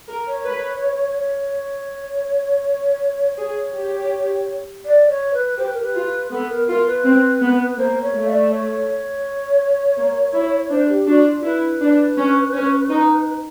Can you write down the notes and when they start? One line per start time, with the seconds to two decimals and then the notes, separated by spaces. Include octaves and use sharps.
0.09 A#4
0.28 C#5
0.45 B4
1.19 C#5
3.38 G#4 C#5
3.75 G4
4.85 D5
5.09 C#5
5.33 B4
5.57 G4 C5
5.65 B4
5.73 A#4
5.82 B4
5.95 F4
6.31 B3 A4
6.49 A#4
6.68 F4 A#4
6.86 B4
7.04 C4
7.41 B3
7.77 A#3 C5
8.02 C#5
8.14 A3
8.26 F5
8.30 D5
8.51 C#5
9.97 A#3
10.33 E4
10.70 D4 C5
10.88 G4
11.06 D4 F#4
11.25 F4
11.43 E4 B4
11.80 D4
12.17 C#4
12.53 C#4
12.89 D#4